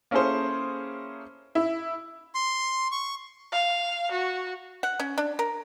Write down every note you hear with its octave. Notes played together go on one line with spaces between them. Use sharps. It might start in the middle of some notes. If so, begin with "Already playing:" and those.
A#3 C#4 E4 G#4 A4 C5
E4
C6
C#6
F5
F#4
F#5
C#4
D4
A#4